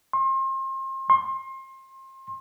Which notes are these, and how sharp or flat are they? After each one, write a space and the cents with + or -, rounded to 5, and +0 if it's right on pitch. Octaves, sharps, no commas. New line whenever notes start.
C6 +35
C6 +30